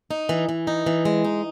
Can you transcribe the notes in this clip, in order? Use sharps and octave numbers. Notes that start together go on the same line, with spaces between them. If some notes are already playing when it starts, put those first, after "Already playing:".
D#4
E3
E3
D#4
E3
G#3
D#4